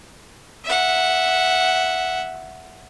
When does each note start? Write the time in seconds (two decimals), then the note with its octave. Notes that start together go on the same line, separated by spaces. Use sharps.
0.64 E5 F#5